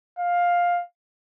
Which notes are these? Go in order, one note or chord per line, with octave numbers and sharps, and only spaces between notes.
F5